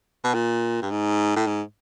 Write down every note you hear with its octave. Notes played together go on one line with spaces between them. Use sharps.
B2
A#2
G2
G#2
A2
G#2